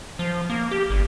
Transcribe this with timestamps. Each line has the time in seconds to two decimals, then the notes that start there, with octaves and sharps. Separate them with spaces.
0.19 F3
0.50 A#3
0.71 G4
0.90 G1